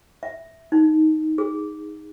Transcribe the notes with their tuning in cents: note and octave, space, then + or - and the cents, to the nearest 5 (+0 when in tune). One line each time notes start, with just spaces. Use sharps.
E5 -5
D#4 +5
G#4 -15